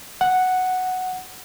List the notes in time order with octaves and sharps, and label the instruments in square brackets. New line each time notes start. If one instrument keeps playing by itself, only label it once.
[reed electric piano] F#5